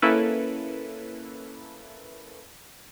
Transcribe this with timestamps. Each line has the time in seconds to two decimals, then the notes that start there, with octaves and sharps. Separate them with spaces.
0.02 A#3 C#4 E4 A4 B4